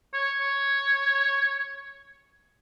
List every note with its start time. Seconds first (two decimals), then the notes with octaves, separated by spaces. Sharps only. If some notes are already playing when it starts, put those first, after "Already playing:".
0.13 C#5
0.40 C#5